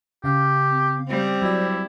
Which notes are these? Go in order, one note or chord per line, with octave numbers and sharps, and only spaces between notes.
C#3 G4 F5
C4
G3 C4 C5
F#3 E4 D5